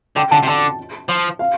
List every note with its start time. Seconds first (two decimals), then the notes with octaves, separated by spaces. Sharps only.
0.16 D3 G5
0.31 D3 A5
0.43 C3
0.47 D3 A5
1.09 F3
1.39 F5